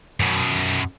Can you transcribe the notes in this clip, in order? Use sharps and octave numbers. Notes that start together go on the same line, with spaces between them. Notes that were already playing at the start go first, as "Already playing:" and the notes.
F#2 B2